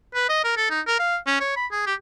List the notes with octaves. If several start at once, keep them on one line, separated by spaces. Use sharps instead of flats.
B4
D#5
A#4
A4
D#4
A#4
F5
C#4
C#5
B5
G#4
G4